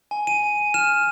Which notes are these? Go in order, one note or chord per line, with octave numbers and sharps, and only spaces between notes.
G#5
D#7
G#5
F6 E7